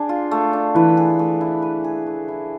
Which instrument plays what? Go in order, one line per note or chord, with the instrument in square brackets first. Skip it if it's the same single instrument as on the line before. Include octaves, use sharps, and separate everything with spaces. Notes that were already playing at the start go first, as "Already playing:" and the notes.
Already playing: [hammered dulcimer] D4 G#4
F4
A3
D4
[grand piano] E3 [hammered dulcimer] B4
[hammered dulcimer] G#4
A3
E4
B4
G#4
A3
E4